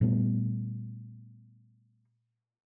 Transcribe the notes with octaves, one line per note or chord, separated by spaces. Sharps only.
A#2 G3 A3 B3